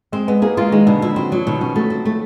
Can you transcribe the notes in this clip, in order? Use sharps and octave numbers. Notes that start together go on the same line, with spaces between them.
G#3 C4
G#3 B3
A#3 G#4
G#3 F4
D#3 G#3
B2 D3
F3 E4
F#3 C4
F3 F#3
B2 D#3
F#3 C#4
F#3 A3
C4
A3